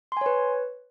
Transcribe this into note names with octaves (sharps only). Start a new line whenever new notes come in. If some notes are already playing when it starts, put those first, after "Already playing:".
B4 C#5 G#5 C6